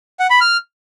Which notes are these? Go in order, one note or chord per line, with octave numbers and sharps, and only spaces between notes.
F#5
B5
F6